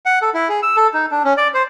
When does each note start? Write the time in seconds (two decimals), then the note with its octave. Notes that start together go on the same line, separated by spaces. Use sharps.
0.06 F#5
0.22 A4
0.34 E4
0.49 G#4
0.63 E6
0.77 A4
0.94 D#4
1.11 D4
1.24 C#4
1.37 D5
1.54 C5